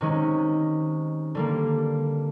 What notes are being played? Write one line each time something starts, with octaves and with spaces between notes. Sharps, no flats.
C3 D#3 G#3 C#4
D3 G3 A#3